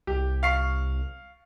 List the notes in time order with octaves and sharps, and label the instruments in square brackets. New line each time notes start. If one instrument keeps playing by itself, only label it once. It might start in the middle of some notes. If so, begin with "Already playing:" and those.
[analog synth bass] C2 [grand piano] G4
[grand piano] F5 C#6 C7